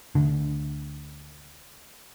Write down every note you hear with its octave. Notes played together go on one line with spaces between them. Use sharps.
D2 D3